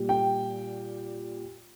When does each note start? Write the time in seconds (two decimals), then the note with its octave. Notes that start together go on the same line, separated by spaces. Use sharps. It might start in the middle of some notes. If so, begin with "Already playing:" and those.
Already playing: A#2 G3
0.09 G5